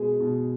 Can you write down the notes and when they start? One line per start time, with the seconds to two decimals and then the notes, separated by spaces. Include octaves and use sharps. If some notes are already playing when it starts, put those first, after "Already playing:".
Already playing: B2 G#3 G#4
0.20 B2